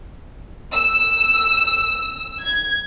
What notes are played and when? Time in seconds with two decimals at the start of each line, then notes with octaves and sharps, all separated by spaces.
0.74 E6
2.41 G#6